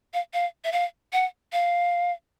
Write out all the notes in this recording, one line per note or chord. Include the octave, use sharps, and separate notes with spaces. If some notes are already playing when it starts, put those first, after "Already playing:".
F5
F5
E5
F5
F#5
F5